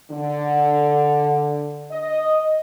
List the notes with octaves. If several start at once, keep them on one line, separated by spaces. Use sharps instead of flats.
D3
D#5